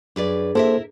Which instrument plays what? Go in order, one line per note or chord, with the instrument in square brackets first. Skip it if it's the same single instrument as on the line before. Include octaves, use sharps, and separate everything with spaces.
[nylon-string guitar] F#2 B4 D5 [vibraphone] D4 G#4
[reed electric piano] A#3 A4 C5 [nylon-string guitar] E4 A#4 E5